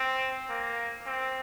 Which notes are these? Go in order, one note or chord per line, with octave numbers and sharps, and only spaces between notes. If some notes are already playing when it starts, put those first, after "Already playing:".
Already playing: C4
A#3
C4